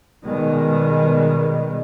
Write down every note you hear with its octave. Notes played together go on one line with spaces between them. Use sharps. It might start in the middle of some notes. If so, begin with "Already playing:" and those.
B2 D#3 G3 G#3